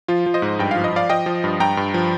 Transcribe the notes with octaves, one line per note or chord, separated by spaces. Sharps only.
F3 F4
F3
C5 D#5
G#2
G2 G5
F3 F5
D#5
F3 D5 F5
F3 D#5 G5
F3
G2
G2 G5 A#5
G2
F3